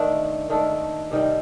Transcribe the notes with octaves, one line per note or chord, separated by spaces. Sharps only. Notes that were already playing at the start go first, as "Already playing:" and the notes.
Already playing: D#3 A3 D4 A4
D#3 A3 D4 A4
C3 D#3 G3